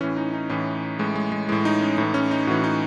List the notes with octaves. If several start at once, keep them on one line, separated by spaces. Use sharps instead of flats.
A2 E3 C#4
D#4
D#4
A2 E3 C#4
A2 E3 G#3
G#3
G#3
A2 E3 G#3
D#4
C#4
A2 E3 D#4
C#4
D#4
A2 E3 F#4
D#4